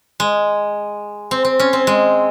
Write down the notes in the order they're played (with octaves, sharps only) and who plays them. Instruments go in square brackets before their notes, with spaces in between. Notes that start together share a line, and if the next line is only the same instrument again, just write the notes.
[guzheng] G#3
C4
C4
C#4
C4
G#3